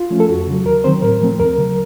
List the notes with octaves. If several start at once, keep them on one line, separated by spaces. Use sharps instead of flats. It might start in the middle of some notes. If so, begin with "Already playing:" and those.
Already playing: F4
F3 A3 C#4
A4
F2 F#4
C#3 F#3
D#2 A#4
D#3 F#3 C4 C5
A2 A#4
F3 A3 C4
D#2 A#4
C#3 F#3